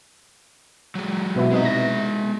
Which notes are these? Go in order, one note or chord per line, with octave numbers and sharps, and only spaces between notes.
F#3 G#3
B2 B3 E4
C3 G#3 D#4 E5
A#6